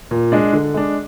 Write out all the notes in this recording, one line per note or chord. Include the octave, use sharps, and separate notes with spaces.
A#2
G#3 D4
D3
G#3 D4